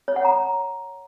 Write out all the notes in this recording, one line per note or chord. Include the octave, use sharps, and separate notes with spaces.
C#5
F#5
A#5